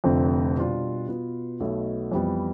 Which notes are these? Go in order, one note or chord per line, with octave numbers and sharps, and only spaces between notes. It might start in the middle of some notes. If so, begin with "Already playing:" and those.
F1 F2 D3 A3 C4
B2 G3 D4 F4
B2 B3 F4 B4
B1 B2 A3
F2 E3 G3 B3